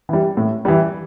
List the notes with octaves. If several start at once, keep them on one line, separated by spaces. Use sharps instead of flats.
E3 G3
A2
E3 G3